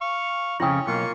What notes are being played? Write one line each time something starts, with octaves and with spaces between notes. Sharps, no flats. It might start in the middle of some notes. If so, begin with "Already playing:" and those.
F5 C#6
F2 A2 C#3 C#4 E4 G5
B1 A#3 F4 C#6